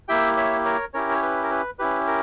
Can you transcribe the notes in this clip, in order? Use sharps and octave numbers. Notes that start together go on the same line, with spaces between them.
A#3 E4 G4 E5 G5
C#5 E5
A#4 C#5
C#4 E4 G4 A#4 C#5
C#5
B4
A#4
B4
C#4 E4 G4 B4
A#4